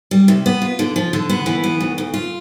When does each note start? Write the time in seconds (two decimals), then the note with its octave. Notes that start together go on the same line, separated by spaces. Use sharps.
0.11 G3
0.28 C3
0.46 B3
0.62 F4
0.79 D3
0.96 F3
1.13 D3
1.29 B3
1.46 E3
1.64 B3
1.81 D2
1.98 D2
2.14 F4